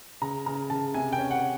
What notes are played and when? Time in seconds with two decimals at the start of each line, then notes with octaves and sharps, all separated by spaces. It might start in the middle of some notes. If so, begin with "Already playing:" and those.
0.22 C#3 A#5
0.46 C#3 A#5
0.70 C#3 A5
0.94 C3 G#5
1.13 G5
1.19 C#4
1.31 F#5